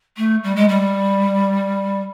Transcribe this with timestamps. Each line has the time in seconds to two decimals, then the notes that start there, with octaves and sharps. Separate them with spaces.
0.17 A3
0.44 G3
0.56 G#3
0.68 G3